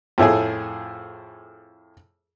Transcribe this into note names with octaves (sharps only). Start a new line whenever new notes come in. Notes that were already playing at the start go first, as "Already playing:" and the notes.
F2 A2 A3 G#4